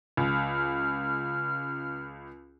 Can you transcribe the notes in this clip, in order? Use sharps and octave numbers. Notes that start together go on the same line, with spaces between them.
C#2 F6